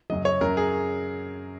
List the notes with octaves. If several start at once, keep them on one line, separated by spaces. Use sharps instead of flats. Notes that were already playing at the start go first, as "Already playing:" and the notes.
F#2 C#3 F#3 D#5
C#5
F#2 F#3 A#4
G#4